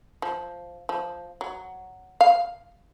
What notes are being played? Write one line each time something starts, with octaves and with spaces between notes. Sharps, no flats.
F3
F3
F#3
F5